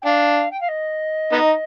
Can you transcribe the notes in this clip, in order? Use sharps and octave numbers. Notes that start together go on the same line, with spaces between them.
G5
D4 F5
G5
F5
D#5
B3 D#4